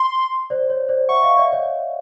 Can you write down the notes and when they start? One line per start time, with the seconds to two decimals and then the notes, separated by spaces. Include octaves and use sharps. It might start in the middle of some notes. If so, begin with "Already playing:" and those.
Already playing: C6
0.50 C5 D5
0.70 C#5
0.89 C5 D5
1.09 E5 F#5 C#6
1.23 D#5 F5
1.37 D5 E5
1.53 C#5 D#5